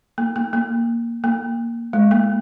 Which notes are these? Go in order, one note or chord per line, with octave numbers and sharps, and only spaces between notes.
A#3
A#3
A#3
A#3
G#3
A#3